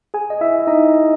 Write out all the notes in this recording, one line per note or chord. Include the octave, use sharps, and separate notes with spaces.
G#4 G#5
D#5
E4 E5
D#4 D#5